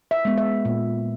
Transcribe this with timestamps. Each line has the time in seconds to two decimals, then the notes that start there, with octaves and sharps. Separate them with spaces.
0.11 E5
0.25 G#3 B3
0.38 E5
0.65 A#2